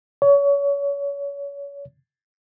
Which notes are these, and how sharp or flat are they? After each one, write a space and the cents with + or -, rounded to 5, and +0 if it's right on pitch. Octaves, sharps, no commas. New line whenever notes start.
C#5 +30